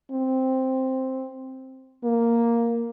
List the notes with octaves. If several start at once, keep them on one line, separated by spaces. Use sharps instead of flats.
C4
A#3